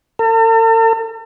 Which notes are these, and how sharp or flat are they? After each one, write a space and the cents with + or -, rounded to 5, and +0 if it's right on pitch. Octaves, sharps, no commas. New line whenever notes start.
A4 +45